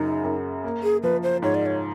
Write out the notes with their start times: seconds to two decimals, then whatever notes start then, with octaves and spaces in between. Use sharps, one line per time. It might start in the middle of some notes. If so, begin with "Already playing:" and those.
Already playing: F#2 C#3 F#3 D#4
0.24 F#2
0.64 A#3
0.83 G#4
1.03 F3 B4
1.23 C5
1.42 G#2 C#5
1.55 D5
1.66 C#5